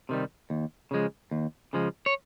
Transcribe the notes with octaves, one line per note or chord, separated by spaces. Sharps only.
C3 D#3 G3
D#2
C#3 F3 G#3
D#2
C#3 F3 G#3
C#5